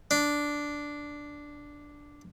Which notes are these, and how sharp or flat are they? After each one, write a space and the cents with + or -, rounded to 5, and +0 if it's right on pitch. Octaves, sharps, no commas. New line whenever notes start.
D4 -5